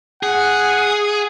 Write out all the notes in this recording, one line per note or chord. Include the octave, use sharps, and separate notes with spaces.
G#4 F#5